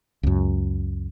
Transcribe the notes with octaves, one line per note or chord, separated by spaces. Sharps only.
C#2 F#2